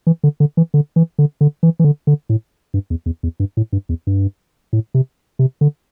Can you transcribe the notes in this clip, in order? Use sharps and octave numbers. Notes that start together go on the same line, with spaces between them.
E3
D3
D3
E3
D3
E3
D3
D3
E3
E3
D3
D3
A2
G2
E2
E2
E2
G2
A2
G2
E2
G2
A2
C3
C3
D3